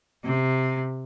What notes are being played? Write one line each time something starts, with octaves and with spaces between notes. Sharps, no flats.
C3